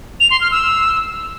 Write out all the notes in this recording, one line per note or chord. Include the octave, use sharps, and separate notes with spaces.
F7
C6
F6
E6